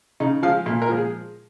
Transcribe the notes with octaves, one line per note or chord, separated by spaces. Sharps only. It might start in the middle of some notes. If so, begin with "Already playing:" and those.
C#3 D#4
F3 G#3 F5
A#2
A#4
F3 G#3
G#4